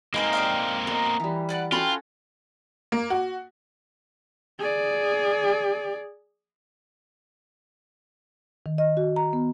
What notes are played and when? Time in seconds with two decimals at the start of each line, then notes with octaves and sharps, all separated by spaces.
0.14 G#3 A#3 C4 D#4 G#4 B4 F5
0.33 G4 D5 F5
0.87 B3 A#4 D#5
1.20 E3 G3
1.49 B4 D5 F#5
1.72 C#4 F4 F#4 A4 G5 A5 B5
2.92 A#3
3.10 F#4
4.59 G#4 D5
8.66 D#3
8.78 D#5
8.97 F#4
9.16 A#5
9.33 B3